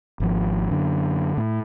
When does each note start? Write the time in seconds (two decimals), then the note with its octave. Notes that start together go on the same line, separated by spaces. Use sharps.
0.20 G#1 F3
0.71 F#2 D3
1.37 A2